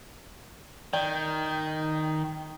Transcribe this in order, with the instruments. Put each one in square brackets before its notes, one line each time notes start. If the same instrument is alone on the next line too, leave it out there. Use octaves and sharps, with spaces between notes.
[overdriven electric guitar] D#3 [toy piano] D5 [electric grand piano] G5